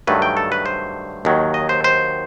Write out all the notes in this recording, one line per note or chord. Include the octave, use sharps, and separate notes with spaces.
G2 D#3 F#3 A3 B4
G5
A4
B4
C5
D#2 D#3 F#3
D#5
C5
C5